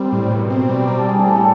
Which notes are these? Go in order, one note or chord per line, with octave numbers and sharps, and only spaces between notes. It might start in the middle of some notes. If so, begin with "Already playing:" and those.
Already playing: G3 C4 A#4
A2
B2
C4
G3
G3 A#4
A4
G3 G#4
A4
A2
A4